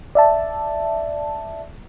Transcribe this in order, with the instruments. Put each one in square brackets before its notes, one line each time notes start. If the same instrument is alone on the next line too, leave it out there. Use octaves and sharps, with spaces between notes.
[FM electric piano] D5 E5 A5